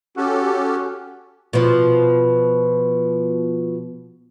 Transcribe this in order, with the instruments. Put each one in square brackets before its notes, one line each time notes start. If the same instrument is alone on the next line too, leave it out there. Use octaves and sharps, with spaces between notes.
[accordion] C#4 G4 A4 [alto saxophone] F#4
[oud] B2 F3